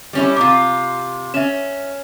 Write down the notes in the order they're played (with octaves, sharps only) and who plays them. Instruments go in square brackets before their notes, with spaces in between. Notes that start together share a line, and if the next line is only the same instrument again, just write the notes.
[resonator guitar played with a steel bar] G3 C#4 E4
[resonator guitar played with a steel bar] C3 F4 [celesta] D6
[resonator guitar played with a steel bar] C#4 [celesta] E5 E7